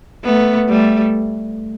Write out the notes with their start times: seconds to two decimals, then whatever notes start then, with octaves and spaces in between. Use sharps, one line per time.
0.24 A3 B3
0.69 G3 A3